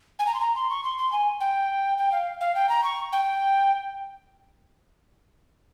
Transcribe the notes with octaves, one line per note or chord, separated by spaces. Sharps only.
G#5
A#5
C6
A#5
C6
C#6
C6
C6
G#5
G5
G5
F5
F5
G5
A#5
C#6
G5